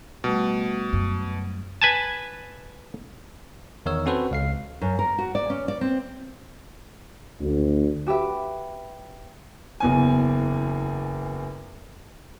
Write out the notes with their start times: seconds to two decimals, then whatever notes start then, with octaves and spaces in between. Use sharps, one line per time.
0.24 B2 G3 A3
0.93 F#2
1.82 B4 G#5 A5
3.86 E2 D#3 D#4 A#4 C#5 E6
4.06 C4 C#4 F#4 A4 B4 C5
4.31 C#2 F5 C7
4.81 F#2
4.99 A#4
5.18 F#4
5.35 D5
5.50 C#4
5.68 D5
5.81 C4
7.40 D2
8.07 F#4 G4 B4 E5
9.80 F#1 E2 G#5